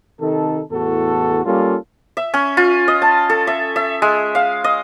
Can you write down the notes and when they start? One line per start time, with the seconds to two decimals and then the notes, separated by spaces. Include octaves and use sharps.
0.20 C3 D#3 D#4 A4
0.70 E2 A2 F#4 A4
1.45 G3 A#3 C#4 F4 A4
2.17 E5
2.34 C#4
2.57 F4
2.88 D#5
3.02 A5
3.30 A4
3.47 E5
3.76 E5
4.02 G#3
4.35 F5
4.64 D#5